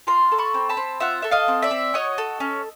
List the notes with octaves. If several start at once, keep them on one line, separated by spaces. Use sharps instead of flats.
F4 A#5 C6
A4
B5 C#6
C4
A5 B5
C4
F4 E5 F#5
A4 E5
D#5 F5
C4
D5 E5
C4
F#4 C#5 D#5
A4
C#4